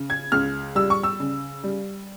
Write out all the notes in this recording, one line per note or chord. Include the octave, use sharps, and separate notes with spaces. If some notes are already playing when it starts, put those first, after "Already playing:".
Already playing: C#3
G#6
C#2 F6
G3 E6
C#6
E6
C#3
G3